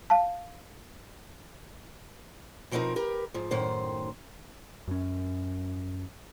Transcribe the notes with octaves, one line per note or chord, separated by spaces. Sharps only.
F5 A5
B2 F3 C4 D4 D#4 A#4
G4 A#4 B4
G#2 F3
F#2 A2 D#3 C5
F#2 C#4